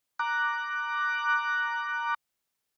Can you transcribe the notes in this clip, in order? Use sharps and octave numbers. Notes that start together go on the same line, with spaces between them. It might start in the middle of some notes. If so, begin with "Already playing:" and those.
A#5 D6 F#6